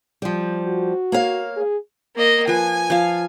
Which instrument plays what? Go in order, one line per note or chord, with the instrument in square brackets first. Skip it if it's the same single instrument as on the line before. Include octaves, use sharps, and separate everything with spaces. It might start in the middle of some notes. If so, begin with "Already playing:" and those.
[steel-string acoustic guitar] F3 G3
[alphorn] F#4
[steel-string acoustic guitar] A#3 C#5 F5
[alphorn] G#4
[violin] A#3 D#5
[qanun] F3 B4 [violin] G#5
[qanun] F3 F5